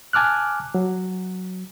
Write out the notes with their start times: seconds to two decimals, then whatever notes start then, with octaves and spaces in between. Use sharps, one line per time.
0.13 G#5 A5 D6 F6 F#6
0.75 F#3